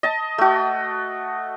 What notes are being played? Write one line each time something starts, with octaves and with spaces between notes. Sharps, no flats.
D#5 A5
A3 F#4